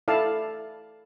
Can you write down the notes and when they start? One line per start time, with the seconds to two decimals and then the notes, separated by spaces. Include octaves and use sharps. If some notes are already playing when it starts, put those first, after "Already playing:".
0.08 E4 A4 D5 F5 A5